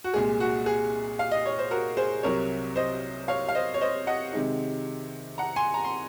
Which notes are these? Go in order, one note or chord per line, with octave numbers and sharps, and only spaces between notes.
F#4
C2 A#2 G#3 G#4
F#4
G#4
F5
D#5
C#5
C5
F#4 A#4
G#4 C5
C2 C3 F#3 A#4 C#5
C5 D#5
C#5 F5
F5
C5 D#5
C#5
C5 D#5
D#5 F#5
C3 D#3 G#3 D#4
F#5 A#5
G#5 C6
A#5
C6